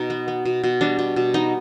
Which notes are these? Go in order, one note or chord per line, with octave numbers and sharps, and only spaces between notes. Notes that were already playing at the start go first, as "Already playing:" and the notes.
Already playing: B2 D#4
B3
B3
B2
B2
G3 D4
B2
B2
B3 D#4